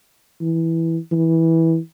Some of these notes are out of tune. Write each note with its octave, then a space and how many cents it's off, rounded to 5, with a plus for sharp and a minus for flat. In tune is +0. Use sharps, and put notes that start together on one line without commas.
E3 -5
E3 -15